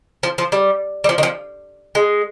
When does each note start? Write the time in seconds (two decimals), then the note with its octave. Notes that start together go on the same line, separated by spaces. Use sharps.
0.23 F3
0.38 F3
0.52 G3
1.04 G3
1.09 F3
1.18 D#3
1.23 F3
1.95 G#3